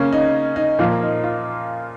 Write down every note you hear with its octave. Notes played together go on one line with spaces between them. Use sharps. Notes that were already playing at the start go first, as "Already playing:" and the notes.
Already playing: C#3 A#3 C#4
D#4
D#4
A#2 F3 A#3 F4
D#4
F4